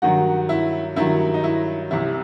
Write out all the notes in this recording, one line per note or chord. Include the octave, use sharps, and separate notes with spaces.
G2 D#3 F#3 F#4
E4
G2 D#3 F#3 E4
D#4
E4
C2 C3 E3 E4